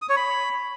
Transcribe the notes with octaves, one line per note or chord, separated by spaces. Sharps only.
D#6
C#5
B5